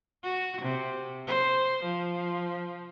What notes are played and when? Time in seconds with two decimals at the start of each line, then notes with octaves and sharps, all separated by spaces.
0.24 F#4
0.62 C3
1.27 C5
1.83 F3